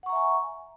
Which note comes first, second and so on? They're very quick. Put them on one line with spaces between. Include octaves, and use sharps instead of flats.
F#5 C#6 A#5 E5 G#5